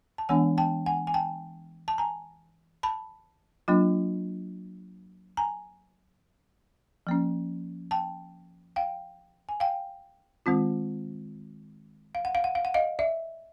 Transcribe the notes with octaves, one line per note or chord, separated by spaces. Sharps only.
A5
E3 G#3 B3 D4 F#5 G#5
G5 A5
F#5 G#5
G#5
G5 A5
A5
G#5 A#5
A5 B5
F#3 A#3 D4 F4
G#5 A#5
F3 A#3 C#4
G5 A5
F5 G5
G#5
F5 G5
D#3 G#3 C4 F4
F5
F#5
F5
F#5
F5
F#5
D#5 F5
D5 E5